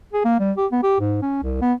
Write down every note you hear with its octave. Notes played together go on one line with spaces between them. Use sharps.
G#4
A#3
G3
G4
B3
G4
G#2
C#4
C2
B3